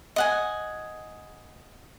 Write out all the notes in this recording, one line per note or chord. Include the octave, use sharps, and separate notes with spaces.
D#5 F#5 G#5